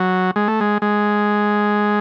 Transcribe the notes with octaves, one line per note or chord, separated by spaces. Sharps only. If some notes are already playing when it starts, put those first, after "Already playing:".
Already playing: F#3
G#3
A3
G#3
G#3